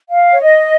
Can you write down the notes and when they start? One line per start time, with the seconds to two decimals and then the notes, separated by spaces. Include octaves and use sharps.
0.10 F5
0.32 C#5
0.40 D#5